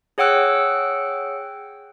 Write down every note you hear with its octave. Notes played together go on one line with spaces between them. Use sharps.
G#4 C#5 F#5 G5 E6 F#6